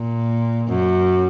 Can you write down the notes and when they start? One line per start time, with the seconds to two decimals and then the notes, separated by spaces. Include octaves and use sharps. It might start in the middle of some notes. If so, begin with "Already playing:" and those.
Already playing: A#2
0.68 F#2